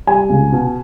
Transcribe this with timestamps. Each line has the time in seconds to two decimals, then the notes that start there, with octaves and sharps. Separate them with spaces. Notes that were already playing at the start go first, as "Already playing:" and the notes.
0.07 G3 G#5
0.29 C#2
0.52 B2